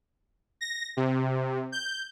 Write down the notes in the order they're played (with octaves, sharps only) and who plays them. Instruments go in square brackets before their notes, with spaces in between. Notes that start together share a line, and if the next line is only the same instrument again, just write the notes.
[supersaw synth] A#6
C3
G6